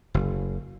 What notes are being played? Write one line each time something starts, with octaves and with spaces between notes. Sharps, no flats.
F#1